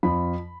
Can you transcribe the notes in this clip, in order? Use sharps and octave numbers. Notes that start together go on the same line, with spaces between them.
F2 F3 B5